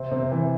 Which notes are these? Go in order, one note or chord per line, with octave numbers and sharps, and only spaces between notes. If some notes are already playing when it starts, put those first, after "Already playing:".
Already playing: C3 C4
C3 C4
E3